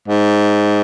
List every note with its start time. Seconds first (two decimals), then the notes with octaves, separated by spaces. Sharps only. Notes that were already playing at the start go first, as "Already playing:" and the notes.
0.08 G#2